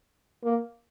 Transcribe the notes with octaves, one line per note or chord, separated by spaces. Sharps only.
A#3